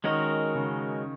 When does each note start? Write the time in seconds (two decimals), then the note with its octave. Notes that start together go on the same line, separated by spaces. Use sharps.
0.04 D#3 G#3 C#4 F#4 A#4 D#5
0.55 C#3